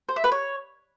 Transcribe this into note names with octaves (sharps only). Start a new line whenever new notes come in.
C5
E5
B4
C#5